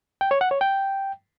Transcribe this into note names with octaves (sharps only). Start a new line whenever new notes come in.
G5
C#5
F#5
C#5
G5